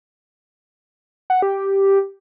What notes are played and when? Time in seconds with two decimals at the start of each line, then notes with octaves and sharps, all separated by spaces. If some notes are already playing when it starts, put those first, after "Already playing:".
1.30 F#5
1.42 G4